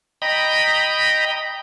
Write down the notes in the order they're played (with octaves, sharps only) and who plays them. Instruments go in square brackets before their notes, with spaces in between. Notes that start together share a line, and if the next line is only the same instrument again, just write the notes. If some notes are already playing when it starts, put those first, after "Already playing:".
[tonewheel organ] D#5 G5 A#5 B5